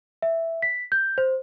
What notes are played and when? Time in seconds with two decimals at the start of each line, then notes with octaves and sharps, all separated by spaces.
0.22 E5
0.62 B6
0.92 G6
1.18 C5